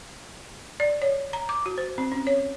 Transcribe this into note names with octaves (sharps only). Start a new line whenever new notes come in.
D5
C#5
A#5
D6
F#4
C5
C4
C#4
C#5